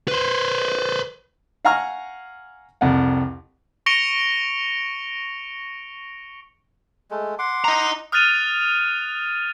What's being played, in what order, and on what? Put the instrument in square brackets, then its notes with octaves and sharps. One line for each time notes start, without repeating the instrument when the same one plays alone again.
[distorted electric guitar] B4 C5
[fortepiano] F5 F#5 G#5 A#5 C#6 F6
C2 F2 F#5
[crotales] C#6 A#6 C#7 D7 F7 G7
[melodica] G#3 A3
F#5 C6 D6
[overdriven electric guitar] D#5 A#5
[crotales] D#6 F6 F#6 A6 D#7 F7